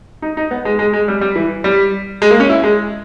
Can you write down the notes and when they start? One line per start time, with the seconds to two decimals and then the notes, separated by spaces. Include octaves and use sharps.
0.22 D#4
0.37 D#4
0.51 B3
0.65 G#3
0.79 G#3
0.93 G#3
1.08 G3
1.21 G3
1.36 E3
1.64 G3
2.22 G#3
2.31 A#3
2.40 C#4
2.50 E4
2.64 G#3